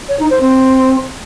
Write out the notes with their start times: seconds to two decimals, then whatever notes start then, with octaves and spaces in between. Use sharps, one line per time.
0.09 C#5
0.20 D#4
0.30 C5
0.41 C4